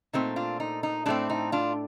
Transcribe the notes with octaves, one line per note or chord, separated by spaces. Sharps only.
A#2 A3 C4 D#4
D4 F4
D#4
D#4
A2 A3 C4 D4
D#4
D4 F4